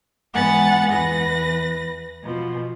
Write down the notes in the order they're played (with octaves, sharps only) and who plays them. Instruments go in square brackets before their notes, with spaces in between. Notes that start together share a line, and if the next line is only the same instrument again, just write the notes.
[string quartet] G#2 E3 B3 F#5 G#5 A6
E2 B4 A#6
B2 F3